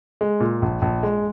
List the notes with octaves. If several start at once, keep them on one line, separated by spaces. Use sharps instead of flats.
G#3
A#2
A#1
A#1
G#3